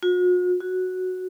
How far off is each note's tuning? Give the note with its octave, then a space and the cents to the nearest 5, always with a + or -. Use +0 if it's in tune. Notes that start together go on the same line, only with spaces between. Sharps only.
F#4 -45
F#4 -5